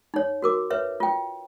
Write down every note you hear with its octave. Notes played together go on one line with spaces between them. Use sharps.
D#4 C#5
F#4 A#4 D6
B4 C#5 E5
F4 G5